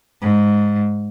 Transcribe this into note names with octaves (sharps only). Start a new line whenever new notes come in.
G#2